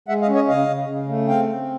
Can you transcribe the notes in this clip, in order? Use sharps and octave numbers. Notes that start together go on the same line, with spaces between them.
G#3 E5 F#5
D#5 F5
C#4
C#5 D#5
C#3 D#5 F5
C#3
C#3
A3
C4 F5 G5
C4